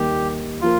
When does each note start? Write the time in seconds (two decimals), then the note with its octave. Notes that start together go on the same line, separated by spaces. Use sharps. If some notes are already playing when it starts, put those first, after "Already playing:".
Already playing: D#2 D#3 G3 G4
0.61 F3 A#3 F4